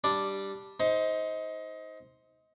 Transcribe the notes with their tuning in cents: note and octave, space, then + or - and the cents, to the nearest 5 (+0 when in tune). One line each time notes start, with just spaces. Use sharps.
G3 +0 D4 +0
D#4 +25 C5 +0